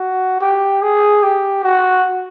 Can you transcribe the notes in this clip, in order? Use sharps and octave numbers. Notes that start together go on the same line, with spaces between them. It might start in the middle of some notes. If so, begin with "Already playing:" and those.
Already playing: F#4
G4
G#4
G4
F#4